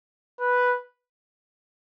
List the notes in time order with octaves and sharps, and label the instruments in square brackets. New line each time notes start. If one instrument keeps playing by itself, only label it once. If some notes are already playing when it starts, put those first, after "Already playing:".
[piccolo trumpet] B4